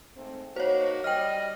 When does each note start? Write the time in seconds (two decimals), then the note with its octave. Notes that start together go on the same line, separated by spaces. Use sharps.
0.16 G#2 A3 C4
0.56 A#3 D#4 F#4 C5 C#5
1.04 G3 D#5 G5 F6